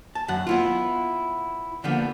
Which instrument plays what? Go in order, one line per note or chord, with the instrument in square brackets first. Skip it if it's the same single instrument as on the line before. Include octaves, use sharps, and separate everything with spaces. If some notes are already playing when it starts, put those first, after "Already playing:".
[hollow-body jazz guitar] A5
F#2 D#3 F#5
B3 E4 F4
D3 F3 G3 A#3 B3